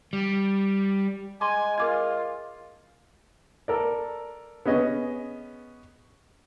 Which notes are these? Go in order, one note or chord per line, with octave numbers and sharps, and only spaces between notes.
G3
G#3 G#5 C6 D6
F4 A#4 D6 G#6
A4 A#4 D5
B3 C#4 G#4 D#5